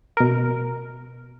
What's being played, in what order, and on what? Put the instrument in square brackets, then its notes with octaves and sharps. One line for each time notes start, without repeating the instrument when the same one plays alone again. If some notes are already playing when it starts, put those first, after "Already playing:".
[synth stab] B2 A#4